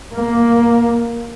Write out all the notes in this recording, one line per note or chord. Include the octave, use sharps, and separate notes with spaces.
A#3